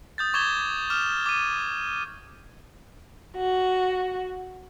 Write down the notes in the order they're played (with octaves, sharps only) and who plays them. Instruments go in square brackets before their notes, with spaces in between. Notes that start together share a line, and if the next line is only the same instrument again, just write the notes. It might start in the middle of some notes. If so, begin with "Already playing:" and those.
[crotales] D#6 G6 A6
C#6 D6 G#6 E7 G7
D6 F6 E7
D6 D#7
[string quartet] F#4